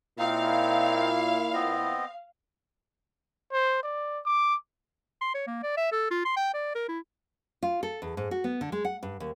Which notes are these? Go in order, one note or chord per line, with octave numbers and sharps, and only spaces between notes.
A#2 C4 D#4 E4 F5
B3 C4 D#5
C5
D5
D6
C6
C#5
A#3
D5
E5
A4
F4
C6
G5
D5
A#4
E4
F4
A4
E2
G#2
F#4
B3
D3
G#3
F#5
G2
D#2